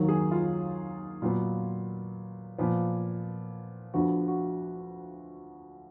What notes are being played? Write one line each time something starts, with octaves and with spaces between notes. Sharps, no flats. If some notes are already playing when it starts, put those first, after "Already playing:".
Already playing: D#2 D#3 F#3 A#3
G#4
F4
A#2 F#3 B3 F4
A#2 F3 B3
D2 D3 F3 B3 F#4
F#4